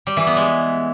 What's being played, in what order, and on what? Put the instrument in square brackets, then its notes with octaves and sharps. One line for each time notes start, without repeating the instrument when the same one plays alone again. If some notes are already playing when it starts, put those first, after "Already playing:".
[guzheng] G3
E3
B3
G#3